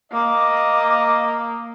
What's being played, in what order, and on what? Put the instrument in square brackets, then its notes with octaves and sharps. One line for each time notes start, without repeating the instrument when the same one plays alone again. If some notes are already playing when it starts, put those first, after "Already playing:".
[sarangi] A#3 [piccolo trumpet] D#5 [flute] D6